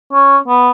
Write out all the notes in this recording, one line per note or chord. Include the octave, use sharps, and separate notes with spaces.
C#4
B3